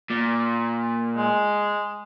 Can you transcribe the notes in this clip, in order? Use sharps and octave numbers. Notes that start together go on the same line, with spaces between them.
A#2
G#3